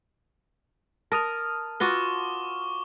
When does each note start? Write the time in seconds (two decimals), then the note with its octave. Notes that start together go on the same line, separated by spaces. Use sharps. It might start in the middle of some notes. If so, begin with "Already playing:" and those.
1.12 A#4 A5 D#6 F6
1.80 F4 F#4 B4 C#6 D6 G7